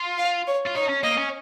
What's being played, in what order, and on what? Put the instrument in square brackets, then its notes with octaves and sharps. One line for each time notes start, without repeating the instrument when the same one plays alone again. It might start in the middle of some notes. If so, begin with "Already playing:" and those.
Already playing: [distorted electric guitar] F4
[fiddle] F5
C#5
[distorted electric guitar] F4
[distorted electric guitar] D#4 [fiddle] C#5
[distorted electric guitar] C#4
[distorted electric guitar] A#3 [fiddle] D#5
[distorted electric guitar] C#4